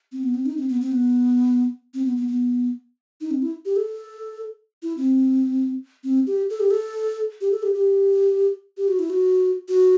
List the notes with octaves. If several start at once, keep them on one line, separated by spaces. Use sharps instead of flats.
C4
B3
C4
D#4
C4
B3
C4
B3
C4
B3
B3
B3
D#4
C4
E4
G4
A4
E4
C4
C4
G4
A4
G4
A4
G4
A4
G4
G4
G4
F#4
E4
F#4
F#4